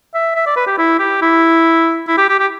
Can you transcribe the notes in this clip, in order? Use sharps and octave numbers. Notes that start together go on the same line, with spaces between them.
E5
E5
D5
B4
G4
E4
G4
E4
E4
G4
G4
G4